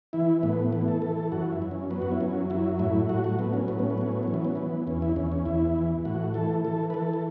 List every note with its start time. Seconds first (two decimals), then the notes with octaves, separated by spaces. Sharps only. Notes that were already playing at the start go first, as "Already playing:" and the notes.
0.13 E3 E4
0.43 A2 B3
0.72 E3 B3
0.88 A4
1.02 E3 A4
1.17 A4
1.32 F#2 F#4
1.52 E4
1.62 F#2
1.71 C#4
1.90 F#3 B3
2.02 F#4
2.11 E4
2.20 F#2 C#4
2.50 F#3 E4
2.79 A2 E4
3.09 A2 F#4
3.24 F#4
3.39 F#3 B3
3.53 C#4
3.68 A2 B3
3.79 C#4
3.90 B3
3.98 F#3 C#4
4.12 B3
4.23 E3 C#4
4.34 B3
4.45 C#4
4.55 E3 B3
4.87 E2 C#4
5.02 E4
5.16 E2 C#4
5.32 C#4
5.45 E2 E4
5.75 E3
6.05 A2 F#4
6.34 E3 A4
6.65 E3 A4
6.90 B4
6.94 E3 A4
7.13 A4